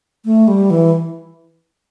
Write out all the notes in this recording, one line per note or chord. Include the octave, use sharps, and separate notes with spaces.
A3
G3
E3